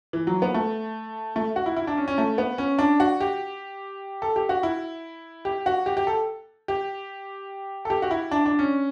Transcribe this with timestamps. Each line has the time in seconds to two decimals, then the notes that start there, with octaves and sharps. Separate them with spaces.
0.13 E3
0.27 F#3
0.42 B3
0.54 A3
1.36 A3
1.56 F#4
1.66 E4
1.77 E4
1.87 D4
1.97 C#4
2.08 C#4
2.18 A3
2.38 B3
2.58 C#4
2.79 D4
3.00 F#4
3.21 G4
4.22 A4
4.36 G4
4.49 F#4
4.63 E4
5.45 G4
5.66 F#4
5.86 G4
5.97 G4
6.07 A4
6.68 G4
7.85 A4
7.90 G4
8.02 F#4
8.11 E4
8.31 D4
8.46 D4
8.59 C#4